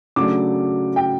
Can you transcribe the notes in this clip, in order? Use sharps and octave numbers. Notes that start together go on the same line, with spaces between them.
C#3 F#3 A3 D4 D6
G5